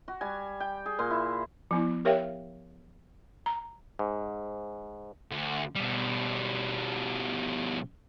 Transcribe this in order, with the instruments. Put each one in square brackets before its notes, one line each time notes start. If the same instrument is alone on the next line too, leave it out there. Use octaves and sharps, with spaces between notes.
[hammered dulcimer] F#4
G3 G#5
G5
G#4
A#2 G#5 C6
E4
[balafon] F3 B3 E4
G4 A#4 C#5 E5 F5 G5
A#5
[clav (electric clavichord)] G#2
[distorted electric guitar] D2
B2 G3